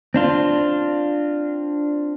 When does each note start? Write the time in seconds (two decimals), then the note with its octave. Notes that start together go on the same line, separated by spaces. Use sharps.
0.14 C4 D4 F4